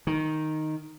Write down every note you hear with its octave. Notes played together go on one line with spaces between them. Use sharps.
D#3